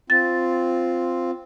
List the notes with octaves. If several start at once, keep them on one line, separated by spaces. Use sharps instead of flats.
C4 F4 A6